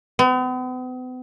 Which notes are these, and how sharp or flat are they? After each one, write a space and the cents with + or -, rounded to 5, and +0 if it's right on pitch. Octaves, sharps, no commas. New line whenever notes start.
B3 +45